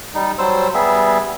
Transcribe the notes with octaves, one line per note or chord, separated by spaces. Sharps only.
G3 D#4
F#3 G3 C5 E6
G3 B3 G#4 E5